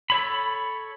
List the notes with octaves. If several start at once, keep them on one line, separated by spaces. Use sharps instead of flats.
A4 C#5 B5